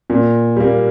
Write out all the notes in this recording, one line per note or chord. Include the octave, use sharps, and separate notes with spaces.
A#2
G3 A#3